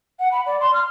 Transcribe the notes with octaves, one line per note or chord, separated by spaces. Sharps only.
F#5
B5
D5
C6
F6